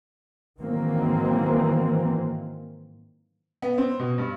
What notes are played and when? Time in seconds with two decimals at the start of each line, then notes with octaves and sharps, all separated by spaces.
0.60 G#2 D#3 E3 F#3 A#3 C4
3.62 B3
3.78 C4
3.99 B2
4.18 G2